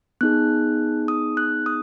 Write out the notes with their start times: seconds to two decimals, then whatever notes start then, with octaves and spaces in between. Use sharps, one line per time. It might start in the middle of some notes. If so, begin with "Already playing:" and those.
0.21 B3 D#4 G#4 F#6
1.08 D#6
1.37 F#6
1.66 D#6